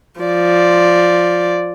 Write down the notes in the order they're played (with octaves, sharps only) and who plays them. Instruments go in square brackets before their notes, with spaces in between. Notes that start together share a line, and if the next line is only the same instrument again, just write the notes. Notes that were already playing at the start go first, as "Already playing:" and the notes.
[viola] F3 D5